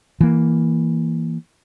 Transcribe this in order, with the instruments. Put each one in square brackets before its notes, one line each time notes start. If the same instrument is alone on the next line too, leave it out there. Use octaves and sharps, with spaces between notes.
[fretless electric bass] E3 A#3